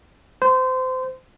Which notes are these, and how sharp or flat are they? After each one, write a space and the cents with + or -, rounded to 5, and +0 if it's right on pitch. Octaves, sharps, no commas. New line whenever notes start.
C5 -25